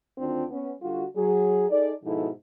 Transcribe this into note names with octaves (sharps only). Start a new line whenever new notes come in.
D2 D#3 C4 D4 F4
B3 C#4
D3 G3 F4 F#4
F#3 G#4
D#4 G#4 A4 D5
G#2 B2 F3 D#4 E4 A4